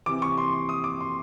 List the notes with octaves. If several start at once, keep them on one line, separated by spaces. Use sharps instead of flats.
C3 E3 D6
C#6
C6
D#6
D6
C6